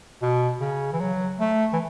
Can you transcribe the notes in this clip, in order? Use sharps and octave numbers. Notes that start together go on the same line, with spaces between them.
B2
C#3
E3
F#3
A3
E3